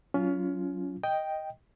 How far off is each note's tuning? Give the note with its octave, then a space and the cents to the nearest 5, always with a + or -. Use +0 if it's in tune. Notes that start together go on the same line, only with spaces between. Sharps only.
F#3 +5 C#4 +25 F4 -10
D#5 +0 G5 +0